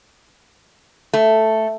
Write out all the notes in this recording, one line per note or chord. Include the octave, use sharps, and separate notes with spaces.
A3